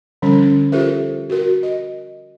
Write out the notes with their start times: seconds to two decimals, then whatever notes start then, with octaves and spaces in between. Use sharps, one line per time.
0.22 D3 F3 G3 C#4
0.72 F4 G4 A4 A#4 C5 E5
1.30 F#4 A#4
1.63 D#5